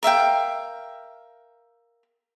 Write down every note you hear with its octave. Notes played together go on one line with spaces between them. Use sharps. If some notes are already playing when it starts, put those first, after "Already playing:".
A#4 E5 F5 G5